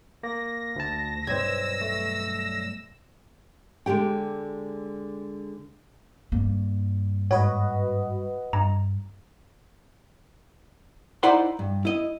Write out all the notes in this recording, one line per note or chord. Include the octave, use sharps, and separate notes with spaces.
A#3 A#6
D2 A5
B1 G2 C5 E6 G#6
A3
D3 G#3 G4 G5
G2 A#3
G#2 F#4 B4 C#5 D#5
G2 A#5
D#4 E4 C5 D5 F#5 C6
G2
E4 D#5